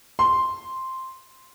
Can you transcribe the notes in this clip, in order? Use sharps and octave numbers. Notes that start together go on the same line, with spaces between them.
C6